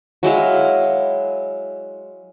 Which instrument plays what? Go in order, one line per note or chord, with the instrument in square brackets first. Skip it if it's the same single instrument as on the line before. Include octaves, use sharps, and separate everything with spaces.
[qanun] F#3 G#3 E4 F5